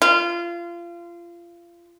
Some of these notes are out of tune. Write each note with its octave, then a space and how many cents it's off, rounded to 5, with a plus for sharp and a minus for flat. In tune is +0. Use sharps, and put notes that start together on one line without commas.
F4 -25